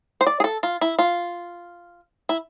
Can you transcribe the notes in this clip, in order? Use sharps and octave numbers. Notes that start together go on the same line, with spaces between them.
C5
D5
G#4
A4
F4
E4
F4
E4